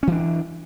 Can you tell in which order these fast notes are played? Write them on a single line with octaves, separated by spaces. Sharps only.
C#4 E3 D4